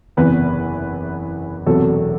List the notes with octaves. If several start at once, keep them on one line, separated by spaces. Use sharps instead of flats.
F#1 E2 C3 E3 B3 B4
E1 E2 C3 F#3 A3 A4